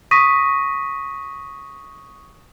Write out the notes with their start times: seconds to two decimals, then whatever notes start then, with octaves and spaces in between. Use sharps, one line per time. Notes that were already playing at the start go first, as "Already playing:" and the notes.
0.11 C#6 D#6 A#6 B6 D#7